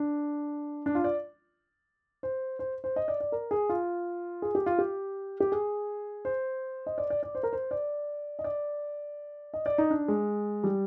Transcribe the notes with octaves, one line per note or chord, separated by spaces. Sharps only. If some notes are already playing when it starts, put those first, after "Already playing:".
Already playing: D4
D4
F4
D5
C5
C5
C5
D#5
D5
D5
A#4
G#4
F4
G#4
G4
F4
G4
G4
G#4
C5
D#5
D5
D5
D5
C5
A#4
C5
D5
D#5
D5
D#5
D5
D#4
D4
G#3
G3